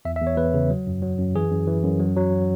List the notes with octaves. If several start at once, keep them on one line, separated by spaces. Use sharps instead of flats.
E2 E5
E5
E2
C#5
E2 B4
C#3
F#3
F#2
F#3
F#2
E3 G#4
F#2
E3
F#2
F#3
F#3